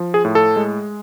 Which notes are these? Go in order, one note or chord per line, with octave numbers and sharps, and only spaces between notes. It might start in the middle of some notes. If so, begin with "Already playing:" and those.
Already playing: F3
G#4
A2
A4
G#3